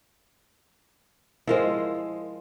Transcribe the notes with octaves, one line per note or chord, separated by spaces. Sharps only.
F3 G#3 E4 A#4 C5